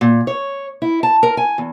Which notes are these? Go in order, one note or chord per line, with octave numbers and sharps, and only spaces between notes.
A#2
C#5
E4
A5
A#4
G#5
E2